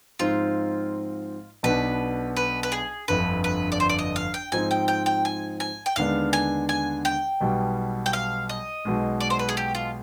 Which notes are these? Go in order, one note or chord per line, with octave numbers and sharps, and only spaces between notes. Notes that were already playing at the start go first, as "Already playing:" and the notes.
G#2 F3 C4 D#4 F4
B1 B2 B3 D4 B4
B4
B4
G#4
G1 F2 D3 B4
B4
D5
C5
D5
D#5
F5
G5
G#2 F3 C4 D#4 G#5
G5
G5
G5
G#5
G#5
G5
D#2 D3 G#3 B3 D4 F5
G#5
G#5
G5
B1 B2 G3
G5
F5
D#5
B1 B2 G#3
D5
C5
B4
G#4
G4
F4